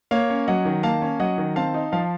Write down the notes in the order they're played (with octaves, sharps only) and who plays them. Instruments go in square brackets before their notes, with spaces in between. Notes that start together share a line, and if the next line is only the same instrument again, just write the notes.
[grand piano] A#3 C#5 F5
C#4
F#3 D#5 F#5
D#3
A#3 F5 A5
C#4
F#3 D#5 F#5
D#3
C4 F5 A5
D#4
F3 F5 A5